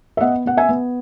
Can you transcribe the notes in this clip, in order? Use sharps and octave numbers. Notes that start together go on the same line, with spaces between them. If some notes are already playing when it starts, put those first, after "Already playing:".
E5
B3 D#5 F#5
B3 F#5
E5 G#5
B3